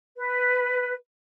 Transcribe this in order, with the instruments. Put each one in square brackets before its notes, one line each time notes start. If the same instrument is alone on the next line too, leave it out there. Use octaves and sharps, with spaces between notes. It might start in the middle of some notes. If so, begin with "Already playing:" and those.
[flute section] B4